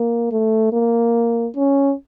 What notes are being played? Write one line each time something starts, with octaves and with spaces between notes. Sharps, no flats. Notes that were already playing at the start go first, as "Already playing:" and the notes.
Already playing: A#3
A3
A#3
C#4